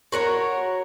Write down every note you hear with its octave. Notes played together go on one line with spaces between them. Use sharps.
F#4 A#4 C#5